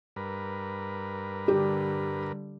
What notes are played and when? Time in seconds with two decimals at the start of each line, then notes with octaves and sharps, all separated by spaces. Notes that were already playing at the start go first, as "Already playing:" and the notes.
0.16 G2 A#4 B4
1.48 D3 G3 G4